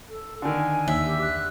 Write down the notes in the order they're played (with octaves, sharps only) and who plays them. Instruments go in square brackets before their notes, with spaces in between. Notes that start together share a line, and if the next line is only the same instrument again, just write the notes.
[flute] A4
[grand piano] D3 D#3 [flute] G#5
[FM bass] D#2 [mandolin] E5
[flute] G4
F#6